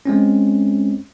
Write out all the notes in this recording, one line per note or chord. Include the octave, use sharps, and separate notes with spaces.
G#3 C4 C#4